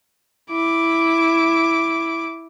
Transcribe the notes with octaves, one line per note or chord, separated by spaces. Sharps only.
E4 D6